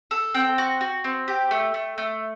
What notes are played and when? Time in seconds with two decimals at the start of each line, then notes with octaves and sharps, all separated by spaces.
0.11 A4
0.34 C4 G5
0.58 F#4
0.81 F#4
1.04 C4
1.28 G4
1.51 A3
1.74 A3
1.98 A3